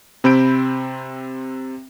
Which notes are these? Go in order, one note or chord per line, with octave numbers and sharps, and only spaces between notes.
C3 C4 B5 G6 D7